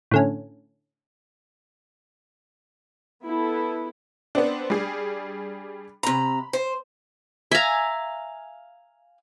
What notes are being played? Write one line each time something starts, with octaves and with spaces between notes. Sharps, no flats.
A2 D3 C#4
B3 E4 A4
B3 C4 D4
G3 D4 G#4
C3 A#5 B5
C5
E5 F5 G#5 A#5